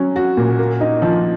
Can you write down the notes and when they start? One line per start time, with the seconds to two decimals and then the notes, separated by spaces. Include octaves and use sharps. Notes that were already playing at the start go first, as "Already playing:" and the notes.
Already playing: F#3 C#4
0.16 F#4
0.37 A#2
0.59 A#3
0.81 D#4
1.02 F3